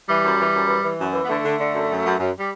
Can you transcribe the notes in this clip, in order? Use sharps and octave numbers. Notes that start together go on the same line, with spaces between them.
E3 G3
F#2
E3
F#2
E3
E3
F#2
E3
B3
D3 A3
D3
D3
F#2
F#2
F#2
F#2
G3